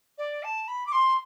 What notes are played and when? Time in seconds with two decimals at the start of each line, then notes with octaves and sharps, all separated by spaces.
0.18 D5
0.43 A5
0.68 B5
0.87 D6
0.92 C6